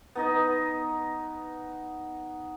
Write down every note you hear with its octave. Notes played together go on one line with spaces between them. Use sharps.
B3 D#4 D#5